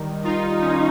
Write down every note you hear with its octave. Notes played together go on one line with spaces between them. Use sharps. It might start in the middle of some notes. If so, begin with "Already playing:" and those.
Already playing: D#3 G3
D#4 F4
C#4